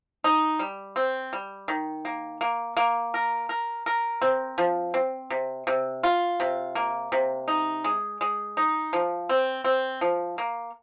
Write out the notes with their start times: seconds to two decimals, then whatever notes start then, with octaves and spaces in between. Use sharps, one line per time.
0.24 D#4
0.59 G3
0.96 C4
1.33 G3
1.68 D#3
2.05 A#3
2.41 A#3
2.77 A#3
3.14 A#4
3.49 A#4
3.86 A#4
4.22 C4
4.58 F3
4.94 C4
5.30 C3
5.67 C3
6.03 F4
6.40 C3
6.75 A#3
7.12 C3
7.48 D#4
7.84 G#3
8.21 G#3
8.57 D#4
8.93 F3
9.29 C4
9.64 C4
10.01 F3
10.38 A#3